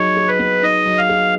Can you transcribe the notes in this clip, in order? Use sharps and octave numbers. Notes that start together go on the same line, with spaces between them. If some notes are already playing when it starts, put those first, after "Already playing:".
Already playing: F#3 D#4 G#4 C#5
G#4
B4
B3
D#4 D#5
F#3
F5
G#4